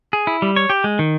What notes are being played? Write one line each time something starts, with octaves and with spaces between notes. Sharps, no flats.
G#4
E4
G3
C#5
G4
G#3
D#3